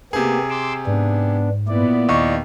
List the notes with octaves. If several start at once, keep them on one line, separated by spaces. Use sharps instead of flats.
C3 A#3 B3 G4 G#4
C6 D6 E6
G#2 B3 D4
A#2 B3 E4 D5
D#2 D#5 C#6